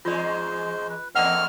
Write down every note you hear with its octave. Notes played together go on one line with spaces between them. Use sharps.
E2 G#2 G#3 F4 C5 D5
B4
E2 A#3 C4 A4 D5 D#5 F#5 F6